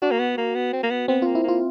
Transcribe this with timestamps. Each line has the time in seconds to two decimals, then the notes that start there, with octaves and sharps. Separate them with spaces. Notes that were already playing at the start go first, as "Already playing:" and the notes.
0.02 D4 F#4
0.11 A#3
0.19 B3
0.38 A#3
0.55 B3
0.73 C4
0.83 A#3
0.91 B3
1.08 B3 C4
1.22 A#3 F4
1.35 E4
1.44 A#3 F4